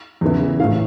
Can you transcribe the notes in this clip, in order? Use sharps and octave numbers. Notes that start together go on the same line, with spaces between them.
E2 C#3 E3
A2 E3 F5